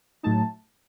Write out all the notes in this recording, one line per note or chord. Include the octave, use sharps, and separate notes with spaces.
A2 F#3 A3 D#4 A5